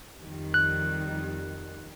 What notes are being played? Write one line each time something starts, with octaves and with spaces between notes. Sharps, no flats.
F2 D#3 G3
F#6